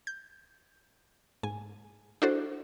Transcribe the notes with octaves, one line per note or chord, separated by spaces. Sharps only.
G6
G#2 G#5
D4 E4 F#4 A4 C5